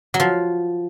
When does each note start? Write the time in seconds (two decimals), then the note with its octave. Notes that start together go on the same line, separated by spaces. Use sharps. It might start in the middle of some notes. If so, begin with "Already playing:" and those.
0.14 F#3
0.20 F3